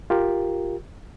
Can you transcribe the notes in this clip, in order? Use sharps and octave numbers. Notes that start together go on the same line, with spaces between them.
F4 G4 A#4